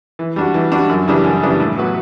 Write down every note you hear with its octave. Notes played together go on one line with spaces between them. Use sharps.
E3
G3 D4 F#4
E3
G3 D4 F#4
F#2
C#3 E3 G3 D4
F#2
C#3 E3 G3 D4
A2
F#3 B3 F#4 B4